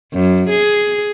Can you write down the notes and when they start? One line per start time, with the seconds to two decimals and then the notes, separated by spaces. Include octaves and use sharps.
0.13 F#2
0.50 G#4